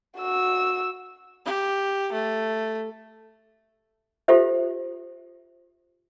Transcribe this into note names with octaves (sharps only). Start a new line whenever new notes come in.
F#4 E6
G4
A3
F4 G4 A4 C5 E5